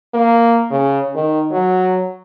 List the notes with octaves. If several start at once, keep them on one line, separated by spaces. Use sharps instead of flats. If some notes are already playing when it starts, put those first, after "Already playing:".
A#3
C#3
D#3
F#3